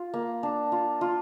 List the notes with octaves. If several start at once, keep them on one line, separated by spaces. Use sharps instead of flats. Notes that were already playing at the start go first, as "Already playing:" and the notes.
Already playing: F4
A#3
D4
F4
F4